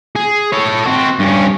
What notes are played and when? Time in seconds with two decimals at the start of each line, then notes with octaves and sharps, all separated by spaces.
0.16 G#4
0.52 A4 C#5
0.86 C4 F#4
1.20 G2 C#4